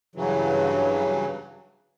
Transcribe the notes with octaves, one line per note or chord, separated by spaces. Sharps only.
G2 C#3 E3 F#3